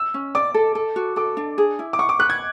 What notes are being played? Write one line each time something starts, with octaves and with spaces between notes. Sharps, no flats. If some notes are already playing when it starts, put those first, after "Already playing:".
Already playing: E6
C#4
D5 D6
A4
A4
F#4
A4 D6
D4
G#4
E4
D6
F#5 C#6
D6
B4 F#6
G#6